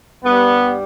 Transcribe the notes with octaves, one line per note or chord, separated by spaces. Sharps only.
G2 G3 B3